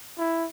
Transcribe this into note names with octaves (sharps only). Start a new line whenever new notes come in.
E4